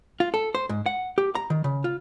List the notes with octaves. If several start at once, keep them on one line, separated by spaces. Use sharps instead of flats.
F4
A4
C5
G#2
F#5
G4
A#5
D#3
C#3
F4